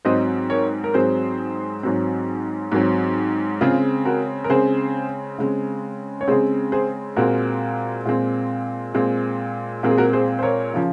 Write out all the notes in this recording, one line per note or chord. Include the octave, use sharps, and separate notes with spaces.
G#2 F#3 C4 C5 D#5
A#4 C#5
A#4
G#2 F#3 C4 G#4 C5
G#2 F#3 C4
G#2 F#3 C4
C#3 G#3 C4 F4 G#4
F#4 A#4
A#4
C#3 G#3 C4 G#4 C5
C#3 G#3 C4
C#5
C#3 G#3 C4 G#4 C5
G#4 C5
A#2 G#3 C4 F#4 A#4
A#2 G#3 C4
A#2 G#3 C4
A#2 G#3 C4 A#4
G#4
F#4 A#4
G#4 C5
C5
A#4 C#5
C#3 F3